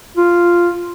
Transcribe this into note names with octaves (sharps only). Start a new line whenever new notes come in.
F4